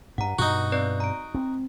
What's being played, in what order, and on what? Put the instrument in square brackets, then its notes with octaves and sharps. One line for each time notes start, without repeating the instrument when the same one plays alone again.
[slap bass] G2 [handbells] F#5 A#5
[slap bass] G2 B2 [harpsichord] D#4 F#4
[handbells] C4 B4 D5
A#5 D7
[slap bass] C4